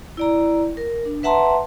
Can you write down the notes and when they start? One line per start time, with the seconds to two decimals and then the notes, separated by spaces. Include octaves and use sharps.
0.17 E4 D5 A#5
0.77 A#4
1.05 D4
1.23 B4 E5 F#5 A5 A#5 C6